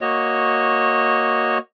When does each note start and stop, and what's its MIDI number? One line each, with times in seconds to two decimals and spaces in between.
0.01 1.58 58
0.01 1.58 66
0.01 1.58 73
0.01 1.58 75